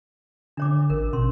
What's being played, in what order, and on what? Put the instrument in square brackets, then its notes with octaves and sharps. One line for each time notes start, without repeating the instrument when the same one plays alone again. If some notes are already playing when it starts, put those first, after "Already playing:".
[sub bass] D3 [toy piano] D4 C#5 D6
[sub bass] A1 [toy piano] A#4
[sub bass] B2 [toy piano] C#4 C6